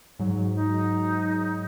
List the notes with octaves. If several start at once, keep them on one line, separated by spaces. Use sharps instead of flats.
G#2 F#3
D#4